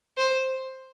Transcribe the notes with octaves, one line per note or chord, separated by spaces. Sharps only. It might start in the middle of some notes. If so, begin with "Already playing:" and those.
C5